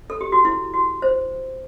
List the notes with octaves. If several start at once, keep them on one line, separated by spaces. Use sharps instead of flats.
A4
G4
F#4
E4
F#4
C5